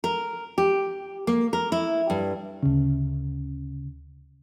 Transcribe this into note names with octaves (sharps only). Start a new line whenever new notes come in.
A#4
G4
A#3
A#4
E4
G2
D2 C#3